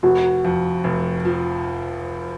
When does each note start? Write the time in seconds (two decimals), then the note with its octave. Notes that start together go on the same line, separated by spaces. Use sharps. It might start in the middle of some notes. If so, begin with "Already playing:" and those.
0.03 F1 F#4
0.44 F2
0.84 F1
1.25 F3